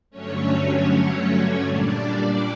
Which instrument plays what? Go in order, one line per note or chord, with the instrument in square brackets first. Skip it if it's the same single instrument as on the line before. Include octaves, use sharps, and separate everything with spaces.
[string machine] G2 D3 F#3 A3 C#4 C#5
A#2 G3 D4 D5